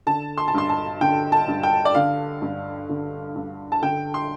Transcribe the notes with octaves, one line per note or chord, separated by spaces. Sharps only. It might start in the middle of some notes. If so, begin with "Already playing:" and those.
D3 A5
C6
A5
G2 C6
A5
D3 G5
A5
G2
G5
D5
D3 F5
G2
D3
G2
A5
D3 G5
C6